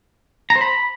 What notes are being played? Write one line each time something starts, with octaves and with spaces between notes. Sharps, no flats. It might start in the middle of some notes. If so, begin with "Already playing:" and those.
A#5
C5
B5